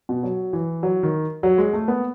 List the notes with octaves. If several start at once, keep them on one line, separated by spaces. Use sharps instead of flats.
B2
F#3
E3
F#3
D#3
F#3
G#3
A3
B3